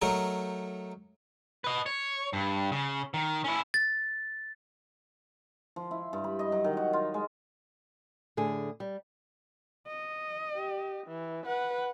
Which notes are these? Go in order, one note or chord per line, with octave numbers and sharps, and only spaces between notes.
F#3 A3 D#4 A#4
B4 D#5
C#5
G2
C#3
D#3
C#4 E4
A6
F3
E4
G2
B5
D#5
F#3
D#3
F#4
F4
G#3
A2 D3 G#4
G3
D#5
G4
E3
B4 F#5